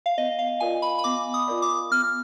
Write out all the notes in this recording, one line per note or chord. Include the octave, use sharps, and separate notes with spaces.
F5
B3 D#5
F5
F4 A#4 D5 G#5
B5
B5
B3 D6
D#6
F4 A#4 D5
D6
B3 F6